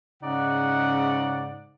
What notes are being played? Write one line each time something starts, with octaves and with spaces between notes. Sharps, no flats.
G#2 C#3 D#4 D5 F#5